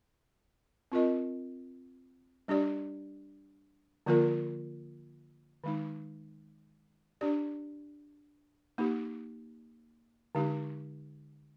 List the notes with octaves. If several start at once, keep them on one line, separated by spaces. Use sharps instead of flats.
C4 F4 A#4 D#5
G3 D4 G4 D5
D3 F3 A#3 F4 A#4
D#3 G#3 D#4
D4 G4 D5
A#3 D#4 G4
D3 G#3 D#4 G4